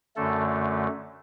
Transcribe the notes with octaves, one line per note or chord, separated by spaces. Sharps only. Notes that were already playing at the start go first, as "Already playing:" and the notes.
F#2 D3 A3 A4